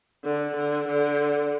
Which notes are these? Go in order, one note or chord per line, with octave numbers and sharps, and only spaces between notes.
D3
D3
D3